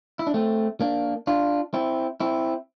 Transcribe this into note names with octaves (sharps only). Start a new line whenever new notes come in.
E4
D4
A3 C4
A#3 D4
D4 F4
C4 E4
C4 E4